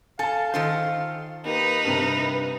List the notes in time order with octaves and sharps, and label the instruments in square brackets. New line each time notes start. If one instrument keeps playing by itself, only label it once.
[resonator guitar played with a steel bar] A4 [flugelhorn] F5 [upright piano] G#5 A5
[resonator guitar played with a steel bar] D#3 F4 C5 [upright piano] A4
[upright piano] A#3 [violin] D#4 B4 [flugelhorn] G4
[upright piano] G2 C3 [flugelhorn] A#4
[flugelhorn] B4